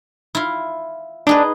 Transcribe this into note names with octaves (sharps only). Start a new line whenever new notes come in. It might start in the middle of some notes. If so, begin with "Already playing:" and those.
E4 F4
D4 D#4 G#4 B4